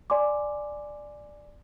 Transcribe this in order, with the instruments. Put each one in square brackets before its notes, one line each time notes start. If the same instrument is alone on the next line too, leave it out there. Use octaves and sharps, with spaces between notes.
[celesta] D5 G#5 C6 D6